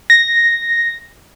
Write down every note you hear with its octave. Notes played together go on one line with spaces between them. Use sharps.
A#6